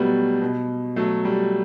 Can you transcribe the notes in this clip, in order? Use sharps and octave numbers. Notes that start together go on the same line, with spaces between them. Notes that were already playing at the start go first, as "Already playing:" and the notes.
Already playing: B2 F#3 G3 A3 B3
B2
F#3 A3
G3